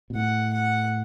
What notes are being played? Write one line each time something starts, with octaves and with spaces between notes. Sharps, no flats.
B2
A2 F#5
F#5